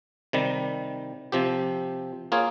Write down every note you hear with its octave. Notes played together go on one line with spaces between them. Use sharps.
C3 D#3 G3
C3 F3 C4 G4
A#3 F4 G#4 C#5